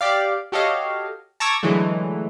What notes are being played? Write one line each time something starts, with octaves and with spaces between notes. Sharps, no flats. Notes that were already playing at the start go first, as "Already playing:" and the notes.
G4 D5 F5
F#4 G4 A4 C#5 D#5 F5
A5 A#5 C#6 D6 E6 G#6
D3 E3 F#3 G#3 A3